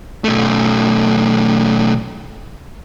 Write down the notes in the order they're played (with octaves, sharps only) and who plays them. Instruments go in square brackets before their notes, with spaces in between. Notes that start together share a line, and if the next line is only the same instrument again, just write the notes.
[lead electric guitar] B1 A3